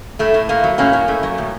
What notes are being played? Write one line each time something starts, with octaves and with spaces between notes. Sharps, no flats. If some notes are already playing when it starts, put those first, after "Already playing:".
A2 A3
A2
A3 A#3
F#3
A2 A#3 C#4
A2
A3
F#3
A2